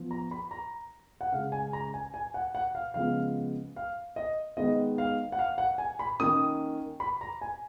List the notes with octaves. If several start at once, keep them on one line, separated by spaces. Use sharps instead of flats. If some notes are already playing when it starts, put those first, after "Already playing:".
Already playing: F3 B3
A#5
B5
A#5
F#5
C#3 G#3 C#4 F5
G#5
A#5
G#5
G#5
F#5
F#5
F5
C#3 F3 G#3 B3 F5
F5
D#5
D#3 G#3 B3 D#5
F5
F#5
F5
F#5
G#5
B5
D#3 A#3 C#4 D#6
B5
A#5
G#5